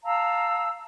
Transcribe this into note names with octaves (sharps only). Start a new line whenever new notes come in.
F5 A5 A#5 E6